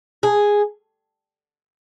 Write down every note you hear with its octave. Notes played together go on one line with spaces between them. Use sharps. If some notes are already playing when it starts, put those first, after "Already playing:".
G#4